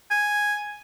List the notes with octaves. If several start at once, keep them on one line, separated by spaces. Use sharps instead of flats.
G#5